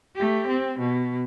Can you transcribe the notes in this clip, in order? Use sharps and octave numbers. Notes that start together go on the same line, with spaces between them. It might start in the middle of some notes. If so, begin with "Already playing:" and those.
A3 G4
C4
B2